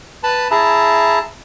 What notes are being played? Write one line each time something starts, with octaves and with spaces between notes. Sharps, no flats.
B4 A5 B5
E4 G#4 E5 A5 A#5